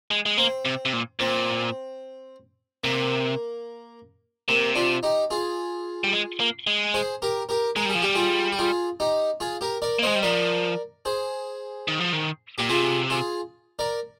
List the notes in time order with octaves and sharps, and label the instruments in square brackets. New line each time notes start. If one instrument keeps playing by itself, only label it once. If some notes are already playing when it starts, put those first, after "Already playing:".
[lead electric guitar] G#3
G#3
[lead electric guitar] A#3 [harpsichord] C4
[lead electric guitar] C3
C3
A#2
[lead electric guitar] A#2 [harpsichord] C4
[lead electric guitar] C3 [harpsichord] A#3
[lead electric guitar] C3 [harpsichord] A#3
[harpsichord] D4 F4
D#4 G4
F4 G#4
[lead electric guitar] G3
G#3
A#3
G#3
[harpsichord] G#4 C5
G4 A#4
G4 A#4
[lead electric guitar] G#3 [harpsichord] A#4
[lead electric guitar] G3 [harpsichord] G#4
[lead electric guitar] F3
[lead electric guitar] G3 [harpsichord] G4
[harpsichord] F4 G#4
G4
F4 G#4
D#4 G4
F4 G#4
G4 A#4
A#4 D5
[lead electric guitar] A#3
[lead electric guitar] G#3 [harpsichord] C5 D#5
[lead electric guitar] G3
[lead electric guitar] F3 [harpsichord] A#4 D5
[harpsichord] G#4 C5
[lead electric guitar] D#3
F3
D#3
[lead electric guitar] A#2 [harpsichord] G4
[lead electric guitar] C3 [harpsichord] F4 G#4
[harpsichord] F4 G#4
A#4 D5